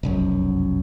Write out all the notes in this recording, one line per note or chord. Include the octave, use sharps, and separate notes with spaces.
F1 B1 F#2